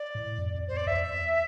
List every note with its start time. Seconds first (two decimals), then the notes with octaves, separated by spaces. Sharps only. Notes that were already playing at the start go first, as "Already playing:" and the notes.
Already playing: D5
0.15 A2
0.38 F2
0.54 F2
0.68 E2 C5
0.77 D5
0.87 F2 E5
1.11 E2